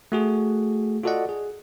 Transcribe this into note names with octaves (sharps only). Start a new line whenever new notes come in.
A3 F#4 G#4
F4 F#4 A4 D5 D#5 F#5
G#4